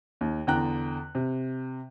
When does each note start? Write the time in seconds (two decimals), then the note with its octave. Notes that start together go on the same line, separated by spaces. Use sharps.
0.21 D#2
0.47 E2 D3 G5 A#5 F#6
1.15 C3